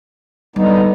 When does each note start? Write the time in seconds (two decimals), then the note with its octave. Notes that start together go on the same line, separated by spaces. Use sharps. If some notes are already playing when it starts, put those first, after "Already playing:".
0.56 D3 G3 B3 D#4